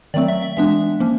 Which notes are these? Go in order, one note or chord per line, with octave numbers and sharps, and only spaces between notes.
D#3 F#3 A3 C4 D5
E5
E5
E3 G#3 B3 D4 E5
F3 A#3 C#4